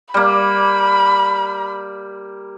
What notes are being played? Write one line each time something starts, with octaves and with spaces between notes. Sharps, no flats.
G3 A#3 B5